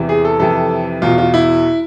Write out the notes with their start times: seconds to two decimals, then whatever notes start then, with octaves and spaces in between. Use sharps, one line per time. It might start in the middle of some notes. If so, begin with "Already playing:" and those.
Already playing: E2 C3 E3
0.09 G#4
0.25 A4
0.40 F2 C3 E3 A4
1.02 E2 B2 F4
1.18 F4
1.34 E4